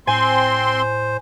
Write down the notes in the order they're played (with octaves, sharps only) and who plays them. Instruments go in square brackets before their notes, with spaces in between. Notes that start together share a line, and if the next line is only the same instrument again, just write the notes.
[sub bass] A2 [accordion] C4 C6 [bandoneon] C5 [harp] G#5